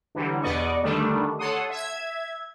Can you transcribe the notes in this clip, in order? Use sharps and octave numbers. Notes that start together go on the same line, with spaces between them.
D3 E3 F#3 G3
E2 B2 B3 D5 D#5 C#6
D3 D#3 G3 A3 D4
A4 C#5 F#5 C6 D#6
E5 G#6